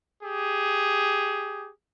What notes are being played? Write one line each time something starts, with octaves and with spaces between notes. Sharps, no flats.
G4 G#4